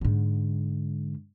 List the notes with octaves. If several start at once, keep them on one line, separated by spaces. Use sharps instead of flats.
G#2 D3